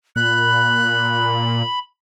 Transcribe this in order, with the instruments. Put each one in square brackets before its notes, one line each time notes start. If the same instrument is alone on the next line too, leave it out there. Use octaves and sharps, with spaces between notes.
[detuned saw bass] A#2 [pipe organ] B5 [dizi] F#6